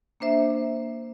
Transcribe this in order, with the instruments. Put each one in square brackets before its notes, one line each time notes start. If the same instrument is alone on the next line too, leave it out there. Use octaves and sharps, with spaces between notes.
[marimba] A#3 D4 C5 E5